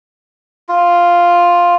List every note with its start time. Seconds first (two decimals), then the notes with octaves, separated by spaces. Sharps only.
0.69 F4